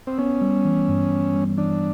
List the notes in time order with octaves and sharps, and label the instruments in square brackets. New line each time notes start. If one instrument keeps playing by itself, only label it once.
[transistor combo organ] C4
[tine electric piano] B3 [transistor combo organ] C#4
[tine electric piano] G3
E3
G2
B3
G3
[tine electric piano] E3 [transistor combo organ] D4